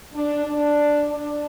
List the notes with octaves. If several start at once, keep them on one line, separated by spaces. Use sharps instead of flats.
D4
D4
D4